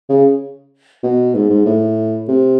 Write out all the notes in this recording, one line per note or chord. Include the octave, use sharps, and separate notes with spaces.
C#3
B2
G#2
G#2
A2
C3